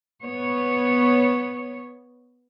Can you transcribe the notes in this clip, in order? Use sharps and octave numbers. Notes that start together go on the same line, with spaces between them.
B3 C#5